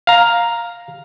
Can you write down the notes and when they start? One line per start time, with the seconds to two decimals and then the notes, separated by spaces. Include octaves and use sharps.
0.07 F5 A#5